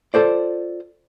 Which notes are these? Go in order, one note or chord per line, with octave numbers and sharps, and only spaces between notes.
F4 F#4 A4 C5 D5